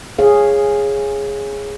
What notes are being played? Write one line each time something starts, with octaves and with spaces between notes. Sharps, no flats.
G#4 C#5 F5